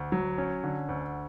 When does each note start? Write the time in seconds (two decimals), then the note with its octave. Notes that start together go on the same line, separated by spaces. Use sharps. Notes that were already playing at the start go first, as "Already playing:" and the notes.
Already playing: D2
0.12 F#3
0.38 C#4
0.64 D3
0.89 D2